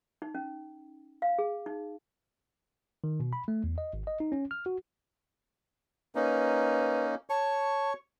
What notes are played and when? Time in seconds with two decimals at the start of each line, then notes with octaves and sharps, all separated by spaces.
0.22 D#4
0.35 C#4
1.22 F5
1.39 G#4
1.66 D#4
3.04 D#3
3.20 B2
3.33 B5
3.48 A3
3.64 E2
3.78 D#5
3.93 G#1
4.07 D#5
4.20 D#4
4.32 C#4
4.51 F6
4.66 F#4
6.15 A#3 C#4 D#4 B4
7.30 C#5 A5 C#6